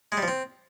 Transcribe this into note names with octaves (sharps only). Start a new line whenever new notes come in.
G#3
G3
F3
C4